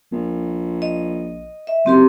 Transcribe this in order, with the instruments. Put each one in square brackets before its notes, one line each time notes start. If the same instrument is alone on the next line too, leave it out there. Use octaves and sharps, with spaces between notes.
[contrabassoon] A#1
[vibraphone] D#5
E5
[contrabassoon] F#1 [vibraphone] C4 G4 C6